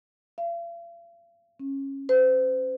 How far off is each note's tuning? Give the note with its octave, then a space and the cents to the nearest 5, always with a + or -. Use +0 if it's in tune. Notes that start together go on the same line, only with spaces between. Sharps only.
F5 -45
C#4 -20
C5 -30